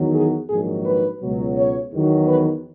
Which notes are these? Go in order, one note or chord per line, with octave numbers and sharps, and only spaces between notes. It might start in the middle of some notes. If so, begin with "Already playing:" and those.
Already playing: E2 D#3 F#3
G#4
A#1 G#2 D#3 F#3 G#4
B4
C#2 B2 F#3
C#5
E2 D#3 F#3
B4